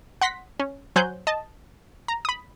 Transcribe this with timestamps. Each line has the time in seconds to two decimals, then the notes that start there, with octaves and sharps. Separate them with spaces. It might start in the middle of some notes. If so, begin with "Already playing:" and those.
0.21 F#5 C6 A#6 B6
0.60 C#4
0.96 F#3 C5 G#5 F#6 G6
1.27 D#5 A5
2.08 A#5
2.25 B5 D#6